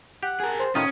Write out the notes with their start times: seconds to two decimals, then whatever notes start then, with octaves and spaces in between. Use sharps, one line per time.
0.23 G4 F#5
0.40 G#4 A#4
0.59 C5
0.75 A2 D#3 C#4 F4 D#6